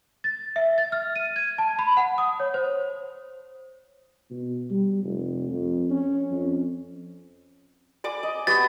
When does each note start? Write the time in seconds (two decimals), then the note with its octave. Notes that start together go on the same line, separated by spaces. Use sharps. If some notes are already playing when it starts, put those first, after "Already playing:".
0.24 A6
0.56 E5
0.78 A6
0.92 F6
1.16 D#7
1.36 G#6
1.58 A5
1.79 B5
1.97 F#5
2.18 D#6
2.40 C#5
2.54 C5
4.30 B2
4.70 G3
5.03 F1
5.49 F2
5.90 C#4
6.31 F2
8.04 D5 G#5 D6
8.23 D#5
8.47 B3 F#4 G4 A6